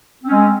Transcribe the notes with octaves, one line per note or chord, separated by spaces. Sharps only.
G#3 C4 C#4